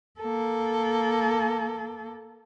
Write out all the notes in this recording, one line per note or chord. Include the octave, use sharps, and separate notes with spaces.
A#3 A4